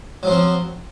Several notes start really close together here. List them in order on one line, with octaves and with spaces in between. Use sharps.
F#3 F3 C4